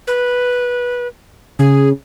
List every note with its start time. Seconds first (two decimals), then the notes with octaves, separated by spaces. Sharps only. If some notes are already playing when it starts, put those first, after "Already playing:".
0.07 B4
1.59 C#3 G#4